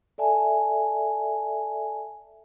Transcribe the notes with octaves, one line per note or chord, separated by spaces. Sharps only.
A4 D5 E5 G#5 A5